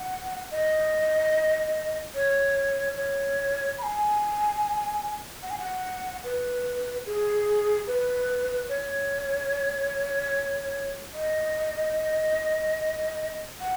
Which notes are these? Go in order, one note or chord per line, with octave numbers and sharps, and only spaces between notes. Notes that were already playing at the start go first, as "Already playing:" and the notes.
Already playing: F#5
D#5
C#5
C#5
B5
G#5
F#5
G#5
F#5
B4
G#4
B4
C#5
D#5
F#5